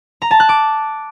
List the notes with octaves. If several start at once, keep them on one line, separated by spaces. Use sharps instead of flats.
A#5
A5
F#6
D6